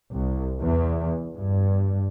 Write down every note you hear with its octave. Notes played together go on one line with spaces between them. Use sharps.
C2
E2
G2